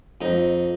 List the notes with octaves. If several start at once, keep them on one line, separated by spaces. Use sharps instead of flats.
F2 D#4